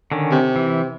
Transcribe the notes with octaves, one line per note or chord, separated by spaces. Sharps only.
D3 D#3 C#4
C3
E3